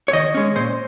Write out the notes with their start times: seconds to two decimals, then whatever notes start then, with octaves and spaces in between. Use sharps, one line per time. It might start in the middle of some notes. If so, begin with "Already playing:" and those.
0.08 C#5
0.13 D#3 D#5
0.35 G#3 C#4
0.56 A#2 C5